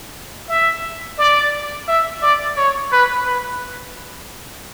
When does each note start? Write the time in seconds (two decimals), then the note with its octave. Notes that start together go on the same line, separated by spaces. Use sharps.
0.49 E5
1.18 D5
1.88 E5
2.22 D5
2.57 C#5
2.93 B4
3.27 B4